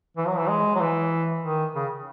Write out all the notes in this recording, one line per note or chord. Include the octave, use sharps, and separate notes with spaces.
E3
F#3
E3
G#3
F#3
E3
D#3
C#3